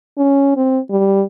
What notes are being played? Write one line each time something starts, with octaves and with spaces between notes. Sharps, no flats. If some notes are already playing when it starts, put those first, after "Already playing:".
C#4
C4
G3